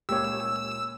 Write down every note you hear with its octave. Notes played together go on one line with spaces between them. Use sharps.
C#2 A#2 A#3 G4 C#5 E6